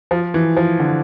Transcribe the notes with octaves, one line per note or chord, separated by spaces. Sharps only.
F3
E3
F3
D3